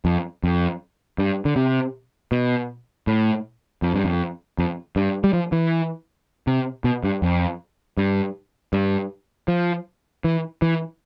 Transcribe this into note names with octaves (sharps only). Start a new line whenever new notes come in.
F2
F2
G2
D3
C3
B2
A2
F2
G2
F2
F2
G2
G3
F3
E3
C3
B2
G2
F2
G2
G2
F3
E3
E3